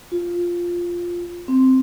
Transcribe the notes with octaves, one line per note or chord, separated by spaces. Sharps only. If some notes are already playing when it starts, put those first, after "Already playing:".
F4
C4